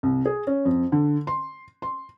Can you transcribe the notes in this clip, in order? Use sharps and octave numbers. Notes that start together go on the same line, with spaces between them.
C2
G#4
C#4
F2
D3
C6
C6